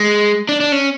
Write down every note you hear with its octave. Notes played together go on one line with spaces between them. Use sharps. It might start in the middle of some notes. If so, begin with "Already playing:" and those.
Already playing: G#3
D4
D4
C#4